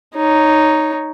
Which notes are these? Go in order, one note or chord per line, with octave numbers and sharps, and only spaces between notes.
D#4 C#5